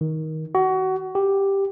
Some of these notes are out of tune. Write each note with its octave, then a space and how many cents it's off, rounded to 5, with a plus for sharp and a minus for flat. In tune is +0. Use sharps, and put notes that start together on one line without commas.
D#3 +20
F#4 +25
G4 +5